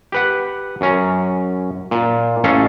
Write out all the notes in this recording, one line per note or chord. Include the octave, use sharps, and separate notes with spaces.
G4 B4 F#5
F#2 C#4 A#5
A#2
A1 C#4 A4 F5